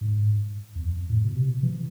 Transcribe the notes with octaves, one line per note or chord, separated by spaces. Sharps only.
G#2
E2
F2
A2
B2
C3
E3